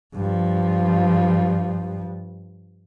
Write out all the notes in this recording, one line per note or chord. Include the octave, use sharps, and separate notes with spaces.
G2 F3